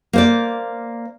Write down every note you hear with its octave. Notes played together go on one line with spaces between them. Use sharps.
A#3 C5 D5